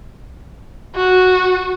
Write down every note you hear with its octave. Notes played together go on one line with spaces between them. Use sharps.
F#4